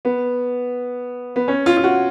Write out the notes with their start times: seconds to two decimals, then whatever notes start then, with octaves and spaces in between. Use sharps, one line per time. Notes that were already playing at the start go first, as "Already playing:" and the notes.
0.05 B3
1.36 B3
1.48 C#4
1.66 F4
1.77 F4
1.84 F#4